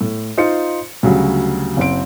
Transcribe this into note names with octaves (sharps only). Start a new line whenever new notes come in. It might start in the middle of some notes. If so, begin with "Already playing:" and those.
A2
D#4 F4 C5 C#7
D2 C#3 F#3 G3
F#1 C4 D7